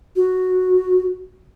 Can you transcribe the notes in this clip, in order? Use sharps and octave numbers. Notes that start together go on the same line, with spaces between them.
F#4